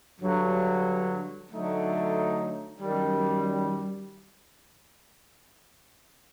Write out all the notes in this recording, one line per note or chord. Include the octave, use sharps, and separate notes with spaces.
G2 D3 F#3
D3 F#3 A3 D#4
F#2 D#3 G3